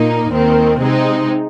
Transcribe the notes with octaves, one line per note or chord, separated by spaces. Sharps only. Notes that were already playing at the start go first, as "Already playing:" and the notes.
Already playing: A#2 A#3 D#4
D#2 D#3 C4
C3 G#3 C4 D#4